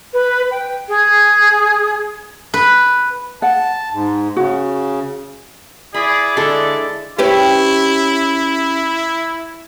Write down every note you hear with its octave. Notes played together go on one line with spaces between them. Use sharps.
B4
G5
G#4
B4
F#5 A5
G#2
C#3 F#4
E4 G#4 D5 B5
D3 G#3 A4 A5
C#4 E4 G4 B4